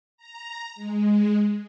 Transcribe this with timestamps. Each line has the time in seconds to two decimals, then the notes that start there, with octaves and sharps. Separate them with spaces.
0.17 A#5
0.75 G#3